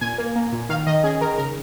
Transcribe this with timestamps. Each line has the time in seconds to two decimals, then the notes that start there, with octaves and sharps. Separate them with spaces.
0.01 A#2 G#5
0.18 A#3
0.36 A#3
0.52 A#2
0.69 D#3 F5
0.87 D#3 D#5
1.04 C#4 G#4
1.21 D#3 A#4
1.38 C#3 A#4